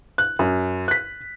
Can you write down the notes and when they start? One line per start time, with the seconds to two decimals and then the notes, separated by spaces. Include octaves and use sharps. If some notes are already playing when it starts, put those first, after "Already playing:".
0.18 F#6
0.39 F#2
0.88 F#6 B6